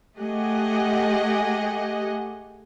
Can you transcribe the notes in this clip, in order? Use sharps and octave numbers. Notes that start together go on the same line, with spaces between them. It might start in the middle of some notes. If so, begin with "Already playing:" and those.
A3 G4 G#4 D#5 F#5